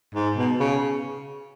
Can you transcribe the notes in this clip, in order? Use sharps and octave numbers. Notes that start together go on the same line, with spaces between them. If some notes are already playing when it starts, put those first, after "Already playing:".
G#2
B2
C#3